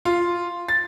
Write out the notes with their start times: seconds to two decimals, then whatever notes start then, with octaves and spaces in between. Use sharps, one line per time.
0.05 F4
0.68 A6